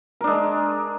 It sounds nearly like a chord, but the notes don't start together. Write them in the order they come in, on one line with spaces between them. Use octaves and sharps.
A#4 D4 G#3